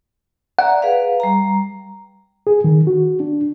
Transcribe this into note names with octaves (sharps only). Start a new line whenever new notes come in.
D5 E5 F#5 A#5
G#4 B4 F5
G3 A#5
G#4
D#3
F#4
D4